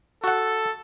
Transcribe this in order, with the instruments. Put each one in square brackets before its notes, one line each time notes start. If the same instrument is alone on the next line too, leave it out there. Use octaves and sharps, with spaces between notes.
[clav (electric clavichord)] F#4 F#5 [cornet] A4